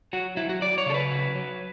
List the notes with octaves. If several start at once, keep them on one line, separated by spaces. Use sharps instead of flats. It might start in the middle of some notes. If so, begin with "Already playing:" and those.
F#3 F#4
F#3 E4
F#4
F#3 D5
C#5
C#3 A4
B4
F#3
F#3